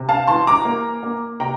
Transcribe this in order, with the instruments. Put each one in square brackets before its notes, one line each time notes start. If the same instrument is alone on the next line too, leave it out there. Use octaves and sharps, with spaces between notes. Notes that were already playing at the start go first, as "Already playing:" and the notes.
Already playing: [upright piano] C3
F5 A5
E3 A5 C6
A#5 D6
A#3
A#3
C3 G5 A#5